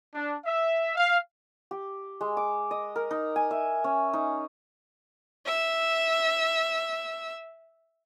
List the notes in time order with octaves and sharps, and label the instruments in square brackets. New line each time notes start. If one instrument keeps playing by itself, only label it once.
[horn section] D4
E5
F5
[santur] G4
G#3
D6
D#5
A#4
D#4
G#5
E5
C#4
D#4
[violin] E5 E6